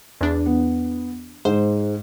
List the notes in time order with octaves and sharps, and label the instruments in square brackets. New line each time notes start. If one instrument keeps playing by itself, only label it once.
[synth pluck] E2 D4
[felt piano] B3
[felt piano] G#2 [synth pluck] C5